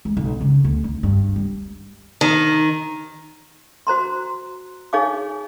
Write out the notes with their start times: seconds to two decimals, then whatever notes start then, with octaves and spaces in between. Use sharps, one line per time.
0.05 G#3
0.17 B1
0.41 C#3
0.64 D2
0.84 D4
1.03 G2
1.36 G3
2.21 D#3
3.87 F#4 C5 A#5 C6
4.93 D#4 G#4 C#5 F5 G#5 D6